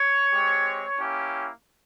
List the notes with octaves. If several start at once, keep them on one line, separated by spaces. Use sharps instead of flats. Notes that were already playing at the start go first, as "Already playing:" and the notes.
Already playing: C#5
G#3 C4 G4
A#3 C#4 E4 G4